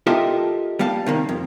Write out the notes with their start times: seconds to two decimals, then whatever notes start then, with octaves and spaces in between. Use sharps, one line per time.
0.07 F4 G4 A4 A#4 D#5 E5
0.79 G3 A#3 F5 A5
1.06 C3 D#3 A#3
1.29 F2